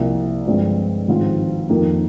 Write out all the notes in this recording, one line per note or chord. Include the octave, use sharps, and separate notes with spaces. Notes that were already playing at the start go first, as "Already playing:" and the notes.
Already playing: C2 C3 F3 A#3
G2 D3 F3 G#3 C4
G#1 G#2 F3 C4 F4
F2 D#3 A#3